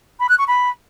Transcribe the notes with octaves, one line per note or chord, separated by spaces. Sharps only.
B5
F#6
C#6
B5